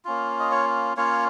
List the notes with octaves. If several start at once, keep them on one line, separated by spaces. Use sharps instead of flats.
A#3 C#4 F4
D#5
C#5
A#3 C#4 F4 C#5